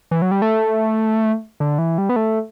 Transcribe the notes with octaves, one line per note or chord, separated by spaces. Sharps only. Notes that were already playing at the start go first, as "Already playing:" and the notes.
E3
F#3
G3
A3
D3
E3
G3
B3
A3